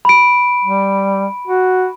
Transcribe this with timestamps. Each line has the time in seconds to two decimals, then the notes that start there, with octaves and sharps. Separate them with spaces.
0.05 B5 D7
0.65 G3
1.47 F#4